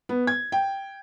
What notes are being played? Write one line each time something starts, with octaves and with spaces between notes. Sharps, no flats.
B3
G#6
G5